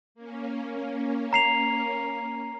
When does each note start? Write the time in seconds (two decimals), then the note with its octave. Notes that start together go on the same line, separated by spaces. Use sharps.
0.15 A#3 C#4
1.33 A#5 C7 F7